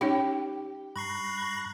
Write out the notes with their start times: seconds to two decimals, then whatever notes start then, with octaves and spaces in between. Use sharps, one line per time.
0.01 C#4 D#4 G4 C#5
0.96 G2 A#5 B5 C#6 F#6 C7